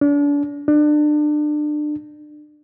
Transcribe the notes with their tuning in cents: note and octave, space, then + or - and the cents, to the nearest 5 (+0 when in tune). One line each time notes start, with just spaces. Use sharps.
D4 -35
D4 +30